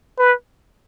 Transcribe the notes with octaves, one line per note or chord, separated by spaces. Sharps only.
B4